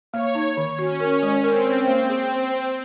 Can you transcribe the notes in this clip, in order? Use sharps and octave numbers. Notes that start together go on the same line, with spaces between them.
A#3 C#5
D#4
D#3
C#4 F#4
A#4
G#3
C4 A#4
C#5
A#3
G#4